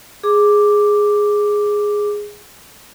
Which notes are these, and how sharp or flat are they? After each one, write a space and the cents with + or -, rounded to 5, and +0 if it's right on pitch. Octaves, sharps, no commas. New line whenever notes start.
G#4 +0 D6 +0